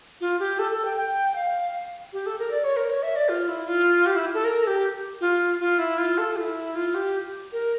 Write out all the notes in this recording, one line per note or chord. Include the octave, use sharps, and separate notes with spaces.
F4
G4
A4
A4
G5
G5
F5
G4
A4
A#4
D5
C#5
A#4
C#5
E5
D5
F4
E4
F4
G4
E4
A4
A#4
A4
G4
F4
F4
E4
F4
A4
F4
E4
F4
G4
A#4